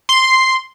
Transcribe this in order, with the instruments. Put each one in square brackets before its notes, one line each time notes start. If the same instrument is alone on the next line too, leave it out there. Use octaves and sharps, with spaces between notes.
[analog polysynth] C6